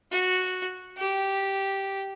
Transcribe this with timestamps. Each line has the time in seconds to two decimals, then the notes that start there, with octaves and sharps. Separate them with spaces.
0.11 F#4
0.98 G4